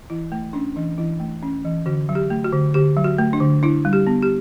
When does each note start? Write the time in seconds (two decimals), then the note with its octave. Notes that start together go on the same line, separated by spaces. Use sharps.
0.10 E3 E4
0.32 A3
0.53 C#4 D4
0.76 E3 D4
0.98 E3 E4
1.20 A3
1.43 C#4
1.65 E3
1.86 D3 F#4
2.09 F#3
2.15 G4
2.30 A3
2.45 F#4
2.52 D3
2.74 D3 G4
2.97 F#3
3.04 F#4
3.18 A3
3.33 D4
3.40 D3
3.63 D4 E4
3.85 G3
3.93 G4
4.07 B3
4.22 G4